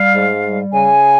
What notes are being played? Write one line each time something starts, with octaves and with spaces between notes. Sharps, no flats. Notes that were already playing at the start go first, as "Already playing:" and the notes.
Already playing: G3 F5
G#2
G3
C#3 G#5